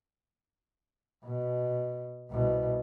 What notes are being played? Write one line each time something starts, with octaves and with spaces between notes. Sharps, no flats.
B2
C2 B2